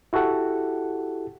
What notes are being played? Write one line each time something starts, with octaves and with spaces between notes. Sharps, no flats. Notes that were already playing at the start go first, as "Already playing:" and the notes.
E4 F#4 G4 A4 F#5